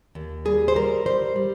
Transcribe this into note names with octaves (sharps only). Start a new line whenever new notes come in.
D#2
G3 G#4
C5
G3 A#4
G3 C5
G3